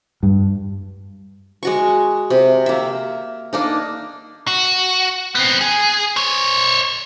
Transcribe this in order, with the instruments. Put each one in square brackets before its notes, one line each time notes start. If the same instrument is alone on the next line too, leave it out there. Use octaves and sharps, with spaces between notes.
[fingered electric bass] G2
[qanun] G#3 F#4 C#6
C3
A#3 E5
A#3 D4 D#4
[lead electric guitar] F#4
B3 C4
G#4
C5 C#5